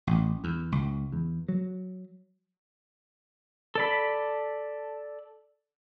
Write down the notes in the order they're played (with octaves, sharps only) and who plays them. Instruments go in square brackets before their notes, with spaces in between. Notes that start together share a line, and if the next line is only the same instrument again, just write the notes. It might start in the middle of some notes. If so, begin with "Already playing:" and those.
[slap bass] A1
E2
C#2
E2
F#3
[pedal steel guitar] A4 D5 B5